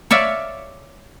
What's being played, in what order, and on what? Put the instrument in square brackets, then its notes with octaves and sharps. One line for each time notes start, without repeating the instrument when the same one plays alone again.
[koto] C#5 D5 E5 F5